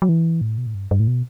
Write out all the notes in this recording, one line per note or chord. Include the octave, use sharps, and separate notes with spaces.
F#3
E3
A2
B2
A2
G2
G2
A2
B2